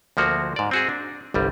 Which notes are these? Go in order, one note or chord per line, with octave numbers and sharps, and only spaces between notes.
D2 F3 A#3 F#4
G#2 D5
C4 F#4 G#4
D4
G1 C2 G3